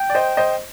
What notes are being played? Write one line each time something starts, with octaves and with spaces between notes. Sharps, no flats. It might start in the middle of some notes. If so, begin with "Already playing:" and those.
Already playing: G5
D5
C5 D#5
C5 D#5